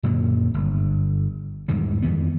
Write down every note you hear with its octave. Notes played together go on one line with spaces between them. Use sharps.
F#2 A#2 D3 F#3
G1
E2 G#2 D#3 G3
F2 D#3 B3